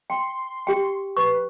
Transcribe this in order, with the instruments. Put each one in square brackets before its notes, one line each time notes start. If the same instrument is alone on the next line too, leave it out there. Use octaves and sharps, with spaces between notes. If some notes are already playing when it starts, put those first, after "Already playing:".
[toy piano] G5 [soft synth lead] C6
[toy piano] G4 G5
[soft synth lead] B4 [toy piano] C#6